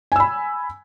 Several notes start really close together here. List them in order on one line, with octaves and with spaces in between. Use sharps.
G#5 E6 B5